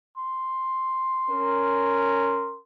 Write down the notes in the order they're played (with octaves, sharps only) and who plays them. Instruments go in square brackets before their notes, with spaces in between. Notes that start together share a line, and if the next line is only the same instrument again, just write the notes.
[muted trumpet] C6
[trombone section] C#4 A#4